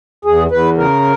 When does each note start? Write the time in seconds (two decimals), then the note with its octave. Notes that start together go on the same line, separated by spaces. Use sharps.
0.25 E2 G#4
0.51 E2 B4
0.78 C#3 A#4